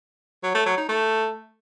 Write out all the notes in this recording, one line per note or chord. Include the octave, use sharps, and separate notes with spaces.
F#3
A3
F#3
D#4
A3